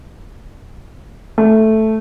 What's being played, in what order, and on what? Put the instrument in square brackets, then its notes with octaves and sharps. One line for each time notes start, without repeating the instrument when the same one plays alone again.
[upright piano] A3